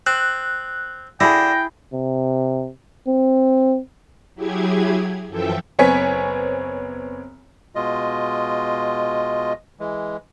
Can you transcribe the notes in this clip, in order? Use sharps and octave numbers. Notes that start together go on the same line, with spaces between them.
C4 F#6
D3 E4 G#4 G5 A#6
C3
C4
F#3 E4 G4 G#4 G#6
F#2 E3 F3 A4 E5 G5
F#1 B3 C4 C#5 G#5 B6
B2 G#3 F4 D#5
E3 G#3